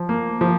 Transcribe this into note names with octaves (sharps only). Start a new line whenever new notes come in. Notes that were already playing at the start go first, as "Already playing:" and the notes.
Already playing: F3
A#3
F3